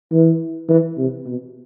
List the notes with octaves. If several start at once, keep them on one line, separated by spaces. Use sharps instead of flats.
E3
E3
C3
B2